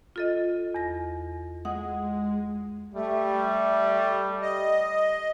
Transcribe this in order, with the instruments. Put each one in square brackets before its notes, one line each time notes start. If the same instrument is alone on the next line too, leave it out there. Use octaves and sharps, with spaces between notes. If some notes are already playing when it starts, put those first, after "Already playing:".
[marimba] F4 A4 D#5
E2 A#6
[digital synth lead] G#3 [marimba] F#5 D#6
[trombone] G3 [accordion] A3
[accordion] D#5